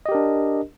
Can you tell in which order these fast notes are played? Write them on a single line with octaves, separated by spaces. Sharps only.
D#5 G4 A#4 D4